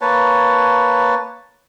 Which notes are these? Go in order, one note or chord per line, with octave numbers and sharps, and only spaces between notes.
A#3 B4 C#5 A5